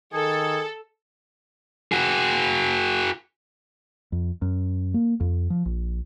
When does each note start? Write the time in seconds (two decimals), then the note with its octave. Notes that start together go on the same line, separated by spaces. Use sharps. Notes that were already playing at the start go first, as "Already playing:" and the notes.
0.13 D#3 G#4 A4
1.92 F#4 G#4
4.12 F2
4.42 F#2
4.94 A#3
5.20 F2
5.50 F3
5.65 A#1